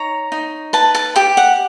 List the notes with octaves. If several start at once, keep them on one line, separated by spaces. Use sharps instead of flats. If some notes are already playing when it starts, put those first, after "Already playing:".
Already playing: D#4 C#5 A#5
D#4
B4 A5
A5
G4 G5
F#5